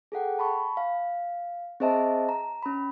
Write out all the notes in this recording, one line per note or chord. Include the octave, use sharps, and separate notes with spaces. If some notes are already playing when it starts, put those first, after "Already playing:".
G#4 A4 F#5 G5
A5 B5 C#6
F5
C4 G#4 C5 D#5 E5 A5
A#5
C#4 B5